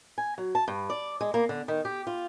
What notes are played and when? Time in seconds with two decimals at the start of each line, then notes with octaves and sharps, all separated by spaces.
0.18 G#5
0.38 F#3
0.55 A5
0.68 G2
0.90 D5
1.21 G#3
1.34 A#3
1.49 D3
1.68 D#3
1.85 G4
2.07 F4